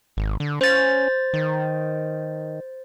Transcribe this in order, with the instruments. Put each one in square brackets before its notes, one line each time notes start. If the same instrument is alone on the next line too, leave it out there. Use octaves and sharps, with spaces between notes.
[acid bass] G#1
D3
[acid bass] C#4 [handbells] C5 A6
[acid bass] D#3